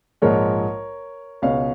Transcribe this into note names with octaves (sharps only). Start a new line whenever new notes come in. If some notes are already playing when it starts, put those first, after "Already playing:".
A#1 G#2 F3 G#3 A#4 C#5
C#2 B2 G#3 C#5 F5